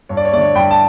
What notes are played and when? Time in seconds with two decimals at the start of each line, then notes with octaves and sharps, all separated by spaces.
0.09 G2 C#5
0.17 D5
0.25 C#5
0.32 A3 D5
0.37 D3 C#5
0.55 G2 G5 B5
0.71 A5